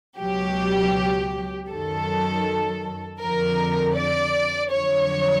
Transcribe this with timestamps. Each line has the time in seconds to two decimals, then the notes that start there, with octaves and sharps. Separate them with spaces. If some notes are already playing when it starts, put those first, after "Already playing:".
0.19 C#2 B2 F#3 G4
1.69 F#2 D#3 F#3 A4
3.20 F2 D3 F3 A#4
3.95 D5
4.70 F2 D3 F#3 C#5